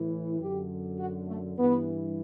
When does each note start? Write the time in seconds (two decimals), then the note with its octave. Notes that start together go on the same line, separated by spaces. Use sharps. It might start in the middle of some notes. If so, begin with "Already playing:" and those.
Already playing: A2 E3
0.39 F#2 D3 G4
0.99 F#4
1.28 A3
1.57 G2 E3 B3